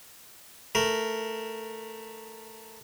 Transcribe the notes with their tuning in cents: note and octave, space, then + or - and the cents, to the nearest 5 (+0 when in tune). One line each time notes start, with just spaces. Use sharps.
A3 +5 A#4 +0